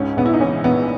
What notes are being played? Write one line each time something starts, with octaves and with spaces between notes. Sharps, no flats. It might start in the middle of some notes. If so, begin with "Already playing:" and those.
Already playing: C#2 G#2 C#4
A#1 B3
E4
D#4
E3 C#4
A#1 B3